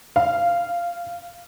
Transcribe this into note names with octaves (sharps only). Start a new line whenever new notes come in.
F5